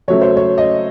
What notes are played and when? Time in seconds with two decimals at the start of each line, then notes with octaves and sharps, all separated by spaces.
0.08 F#2 C#3 F#3 A3 C#5
0.22 C5
0.37 C#5
0.58 D#5